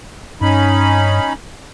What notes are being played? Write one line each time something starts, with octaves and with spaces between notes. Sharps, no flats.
G2 C#4 D#4 B5